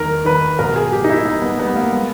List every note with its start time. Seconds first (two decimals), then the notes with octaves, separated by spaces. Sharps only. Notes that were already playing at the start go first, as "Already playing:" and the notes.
Already playing: E2 D#3 A#4
0.25 D#3 B4
0.59 B2 A#4
0.76 G#4
0.92 B2 G4
1.04 D#4
1.10 E4
1.26 G3 D#4
1.42 B3
1.59 G3 B3
1.76 A#3
1.92 G#3 B3